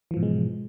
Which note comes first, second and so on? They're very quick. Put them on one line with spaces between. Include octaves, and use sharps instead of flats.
E3 F3 G#2 B2 G#3